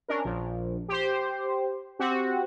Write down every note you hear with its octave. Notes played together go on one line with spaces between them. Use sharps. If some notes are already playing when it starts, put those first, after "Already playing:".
C#4 D4 A#4
A#1
G4 C5
C4 F#4 G4